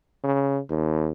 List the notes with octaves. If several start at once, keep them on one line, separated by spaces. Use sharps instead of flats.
C#3
D#2